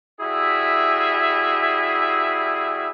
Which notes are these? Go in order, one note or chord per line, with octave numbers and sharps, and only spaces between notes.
G3 E4 F#4 G#4 E5